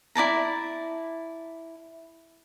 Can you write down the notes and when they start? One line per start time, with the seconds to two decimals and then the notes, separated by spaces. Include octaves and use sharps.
0.15 E4 D5 A5 A#5